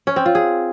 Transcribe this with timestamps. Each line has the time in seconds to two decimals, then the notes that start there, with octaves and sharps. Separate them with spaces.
0.07 C#4
0.16 C4
0.26 F4
0.35 G#4